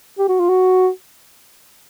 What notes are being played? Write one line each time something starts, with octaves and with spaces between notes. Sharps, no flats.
G4
F#4
F4
F#4